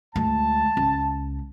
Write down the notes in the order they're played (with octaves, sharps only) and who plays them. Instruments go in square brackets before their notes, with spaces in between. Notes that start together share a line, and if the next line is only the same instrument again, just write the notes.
[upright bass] D2 G#3 [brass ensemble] A5
[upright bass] C#2